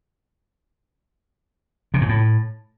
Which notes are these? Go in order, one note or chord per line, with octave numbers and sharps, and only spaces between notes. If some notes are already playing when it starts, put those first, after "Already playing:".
C3
G#2
A2